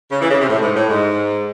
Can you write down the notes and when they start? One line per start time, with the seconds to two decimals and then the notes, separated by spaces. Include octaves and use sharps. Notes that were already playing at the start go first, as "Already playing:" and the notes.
0.11 C#3
0.21 E3
0.30 C#3
0.40 C3
0.49 A2
0.62 G#2
0.75 A2
0.89 G#2